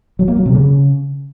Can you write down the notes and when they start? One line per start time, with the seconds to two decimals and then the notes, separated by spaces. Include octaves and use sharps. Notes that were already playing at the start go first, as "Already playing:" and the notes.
0.19 F#3
0.28 A#3
0.37 F#3
0.46 C3
0.55 C#3